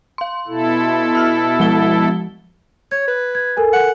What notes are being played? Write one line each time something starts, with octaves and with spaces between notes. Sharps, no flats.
F5 C6
B2 E4 A4
E6 F6
F3 G#3 G7
C#5 G#6
B4
G#6
A4 A#4 G#5
F#5